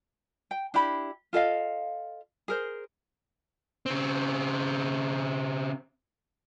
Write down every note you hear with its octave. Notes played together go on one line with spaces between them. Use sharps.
G5
D4 E4 G4 B5
F4 A4 D#5 F5
G#4 A#4 C5
C#3 C4